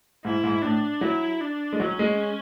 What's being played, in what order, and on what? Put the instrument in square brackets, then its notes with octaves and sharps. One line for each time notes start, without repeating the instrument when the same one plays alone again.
[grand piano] G#2 [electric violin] E4
[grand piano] G#2
[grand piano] A2 [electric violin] D4
[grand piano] F#3 [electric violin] E4
[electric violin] D4
[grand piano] G#3
[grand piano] F#3 [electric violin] C#4
[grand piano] G#3